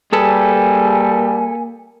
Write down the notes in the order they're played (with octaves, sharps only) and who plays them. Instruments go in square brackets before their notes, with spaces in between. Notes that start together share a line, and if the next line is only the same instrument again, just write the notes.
[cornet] G3 [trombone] A#3 [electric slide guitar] G#4 A4 B4 [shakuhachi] G#5